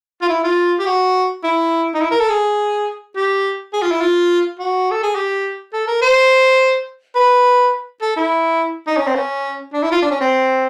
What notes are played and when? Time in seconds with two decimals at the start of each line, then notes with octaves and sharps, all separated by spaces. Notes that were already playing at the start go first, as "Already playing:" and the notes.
0.22 F4
0.29 E4
0.44 F4
0.79 G4
0.86 F#4
1.44 E4
1.95 D#4
2.01 E4
2.11 A#4
2.20 A4
2.30 G#4
3.16 G4
3.73 G#4
3.83 F4
3.92 E4
4.01 F4
4.59 F#4
4.91 A4
5.03 G#4
5.16 G4
5.74 A4
5.88 A#4
6.02 C5
7.16 B4
8.02 A4
8.17 E4
8.87 D#4
8.97 C#4
9.07 C4
9.15 C#4
9.74 D4
9.83 E4
9.92 F4
10.02 D4
10.11 C#4
10.21 C4